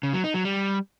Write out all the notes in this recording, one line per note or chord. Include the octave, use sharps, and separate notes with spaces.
C#3
F#3
D#4
F#3
G3